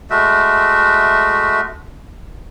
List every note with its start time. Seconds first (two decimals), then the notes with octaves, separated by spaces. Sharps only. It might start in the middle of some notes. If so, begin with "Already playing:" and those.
0.10 G#3 A3 F#4 E5